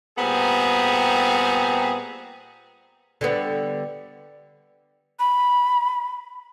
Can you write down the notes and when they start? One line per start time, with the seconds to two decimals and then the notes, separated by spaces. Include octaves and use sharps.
0.19 A#2 G3 B3 C4 G#4 A#5
3.21 D3 G3 B3
5.19 B5